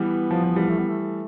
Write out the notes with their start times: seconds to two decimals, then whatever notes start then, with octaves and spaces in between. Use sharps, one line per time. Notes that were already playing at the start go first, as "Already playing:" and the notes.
Already playing: E3 G3 B3
0.31 F3
0.44 F3
0.56 E3 G3
0.69 A3
0.78 B3
0.89 A3